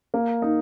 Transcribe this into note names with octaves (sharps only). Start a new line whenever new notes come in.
A#3
D#4